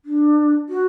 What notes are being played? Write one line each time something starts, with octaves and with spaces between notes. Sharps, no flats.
D4
F#4